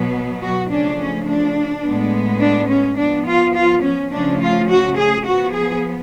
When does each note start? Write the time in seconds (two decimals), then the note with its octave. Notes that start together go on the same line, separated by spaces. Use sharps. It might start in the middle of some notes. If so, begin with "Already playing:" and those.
Already playing: B2 F#3 B3
0.42 F#4
0.69 C#3 F3 A3 C#4 D4
0.98 C#4
1.27 D4
1.83 A2 G#3 B3
2.41 D4
2.69 C#4
2.97 F3 B3 D4
3.26 F4
3.54 F4
3.83 C#4
4.11 C#3 F3 A3 C#4 D4
4.40 F4
4.69 F#4
4.97 G#4
5.25 F3 B3 F#4
5.53 G#4